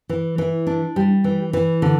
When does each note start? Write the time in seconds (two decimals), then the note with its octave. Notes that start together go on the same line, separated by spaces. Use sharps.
0.09 E3
0.38 E3
0.67 D4
0.96 G3
1.24 E3
1.53 E3
1.82 D3